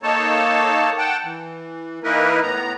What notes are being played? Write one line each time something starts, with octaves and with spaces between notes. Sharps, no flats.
A#3 D#4 A4 C#5 A5
F#5 G5 A5
E3
E3 A#3 D#4 E4 A#4 B4
A2 B3 A#5